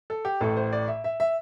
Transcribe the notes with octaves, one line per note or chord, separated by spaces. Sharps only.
A4
G4
A1 A2 A3 A4
C5
D5
E5
E5
E5